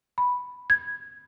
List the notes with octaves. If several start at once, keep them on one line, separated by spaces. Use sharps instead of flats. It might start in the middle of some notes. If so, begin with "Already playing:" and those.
B5
G#6